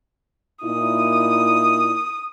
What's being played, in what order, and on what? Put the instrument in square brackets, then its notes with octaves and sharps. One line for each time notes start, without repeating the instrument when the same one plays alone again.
[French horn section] A#2 D#4 E4 [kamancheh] D#6